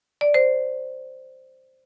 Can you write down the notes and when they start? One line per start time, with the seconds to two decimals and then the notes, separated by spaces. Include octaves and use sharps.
0.21 D5
0.34 C5